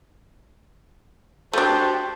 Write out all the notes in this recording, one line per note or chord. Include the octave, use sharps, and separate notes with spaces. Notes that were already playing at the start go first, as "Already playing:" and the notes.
A3 D4 F#4 G4 C5 A5